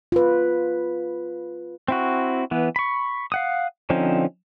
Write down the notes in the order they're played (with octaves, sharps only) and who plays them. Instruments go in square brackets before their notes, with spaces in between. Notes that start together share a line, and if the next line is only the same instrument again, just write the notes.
[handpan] F4 B4
[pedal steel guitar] C4 E4 F#4
E3 B3
B5 C#6
F5 F#5 D#6
D3 F3 C4 C#4 D#4